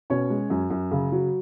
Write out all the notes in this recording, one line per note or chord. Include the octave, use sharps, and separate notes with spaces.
B2 C#4 C#5
G#3
F#2
F#2
C#3
F#3